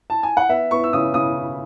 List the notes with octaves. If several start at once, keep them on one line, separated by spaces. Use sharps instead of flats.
A5
G#5
F#5
B3 E5
B3 C#6
E6
C#3 D#6
C#3 D#6